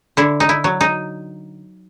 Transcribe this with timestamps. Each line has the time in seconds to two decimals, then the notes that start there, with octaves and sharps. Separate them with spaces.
0.17 D3 E4
0.40 D#4
0.49 E4
0.64 F#3
0.81 D#4